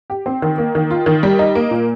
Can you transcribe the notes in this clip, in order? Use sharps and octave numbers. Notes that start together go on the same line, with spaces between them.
G4
C4
D#3
A#3
D#3
F4
D#3
G3
D#4
A#3
A#2